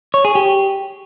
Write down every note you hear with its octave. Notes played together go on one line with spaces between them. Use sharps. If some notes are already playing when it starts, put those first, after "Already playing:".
C#5
G#4
G4